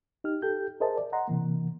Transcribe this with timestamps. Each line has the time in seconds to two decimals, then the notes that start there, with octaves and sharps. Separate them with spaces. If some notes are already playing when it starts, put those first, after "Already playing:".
0.24 D#4 G4 F6
0.42 G4 A4 G6
0.80 G#4 A#4 C5 D#5 E5 A5
0.98 D5
1.12 D#5 F#5 A#5 C6
1.28 C3 E3 A#3